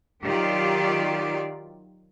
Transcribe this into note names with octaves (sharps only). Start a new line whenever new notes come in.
D#3 F#3 F4 G4 D5